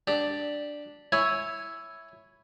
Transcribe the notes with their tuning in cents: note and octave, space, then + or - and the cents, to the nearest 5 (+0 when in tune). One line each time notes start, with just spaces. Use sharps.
D4 +0 G4 +0
E4 +0 C#5 +0 G#5 +0